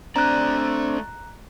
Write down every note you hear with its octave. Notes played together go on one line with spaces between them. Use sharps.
A3 C4 D4 D5 A#5 F#6